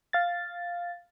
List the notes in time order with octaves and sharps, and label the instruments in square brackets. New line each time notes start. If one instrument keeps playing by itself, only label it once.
[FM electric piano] F5 A6